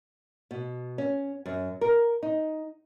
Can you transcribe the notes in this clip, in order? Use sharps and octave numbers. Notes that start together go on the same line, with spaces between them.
B2
C#4
F#2
A#4
D#4